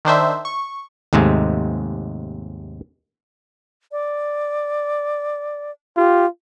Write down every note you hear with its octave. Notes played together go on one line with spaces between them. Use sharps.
D#3 D4 C5 E5
C#6
D#2 G#2 C3 G#3 A3
D5
F4 G4